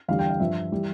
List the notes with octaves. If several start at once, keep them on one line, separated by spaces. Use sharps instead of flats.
E2 D3 G3 F5
G5
F5
G2 F3 E5
E3 G3